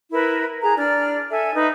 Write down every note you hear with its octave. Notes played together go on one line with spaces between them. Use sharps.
E4 A#4 B4
G#4 A#5
D4 D5 F6
A4 E5 G#5
D#4 B4